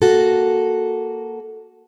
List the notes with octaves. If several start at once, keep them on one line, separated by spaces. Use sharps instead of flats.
A#3 F#4 A4